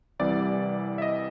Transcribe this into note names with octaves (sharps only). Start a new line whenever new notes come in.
C2 C3 E3 G3 D5
E5
D#5